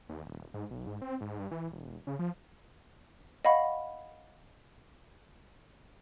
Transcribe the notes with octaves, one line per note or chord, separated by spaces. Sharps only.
D#2
D#1
G#2
B1
G#2
C4
G#2
G2
E3
E1
C#3
F3
D#5 F5 F#5 B5 C#6